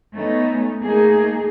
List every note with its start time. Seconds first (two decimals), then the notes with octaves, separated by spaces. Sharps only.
0.14 A3 B3 C#4 D#4
0.81 A3 A#3 D#4 G#4